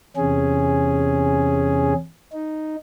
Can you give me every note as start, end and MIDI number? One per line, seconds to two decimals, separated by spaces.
0.17 1.93 40
0.17 1.93 48
0.17 1.93 61
0.17 1.93 68
2.32 2.75 63